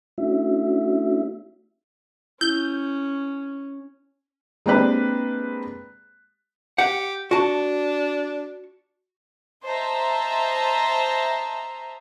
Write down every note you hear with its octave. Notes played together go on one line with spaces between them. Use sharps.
A3 C#4 D4 E4 F#4 E5
C#4 E4 G6
G#3 A#3 C4 D4 G4 B4
G4 F#5
D4 F#4 A5
C5 D#5 E5 A5 A#5